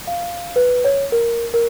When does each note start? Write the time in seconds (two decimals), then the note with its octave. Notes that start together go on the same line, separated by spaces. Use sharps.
0.07 F5
0.56 B4
0.84 C#5
1.12 A#4
1.54 A#4